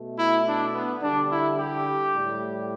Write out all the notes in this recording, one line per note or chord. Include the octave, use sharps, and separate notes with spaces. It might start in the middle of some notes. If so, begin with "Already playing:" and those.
Already playing: B2 A3
E4
D4
B3
D3 G3 D4
E4
G4
A2 G3